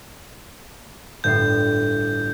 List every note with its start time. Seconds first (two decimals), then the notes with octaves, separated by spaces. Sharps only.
1.24 G1 A2 G6 C7